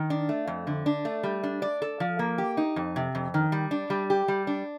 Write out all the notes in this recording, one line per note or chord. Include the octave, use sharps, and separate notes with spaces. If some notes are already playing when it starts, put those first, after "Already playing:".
Already playing: D#3
D4
A3
F2
D3
D4
A3
G3
D4
D5
A4
F3
A#3
G4
D#4
F2
C3
F2
D#3
G3
D4
G3
G4
G3
D4